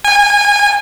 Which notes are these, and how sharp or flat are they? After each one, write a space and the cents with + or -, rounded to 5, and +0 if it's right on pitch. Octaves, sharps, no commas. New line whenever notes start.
G#5 -25